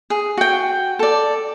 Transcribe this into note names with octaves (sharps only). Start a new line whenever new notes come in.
G#4
F#4 G5
A4 D5